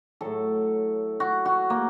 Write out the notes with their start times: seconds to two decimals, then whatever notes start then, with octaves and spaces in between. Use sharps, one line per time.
0.21 A2 F#3 A4
1.20 F#4
1.45 F#4
1.70 A#3